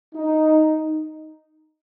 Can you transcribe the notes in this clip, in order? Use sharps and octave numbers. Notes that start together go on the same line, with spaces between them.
D#4